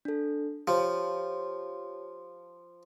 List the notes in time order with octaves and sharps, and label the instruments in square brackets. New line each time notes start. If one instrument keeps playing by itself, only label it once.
[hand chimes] D4 A4
[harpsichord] F3 [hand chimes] G4 C#5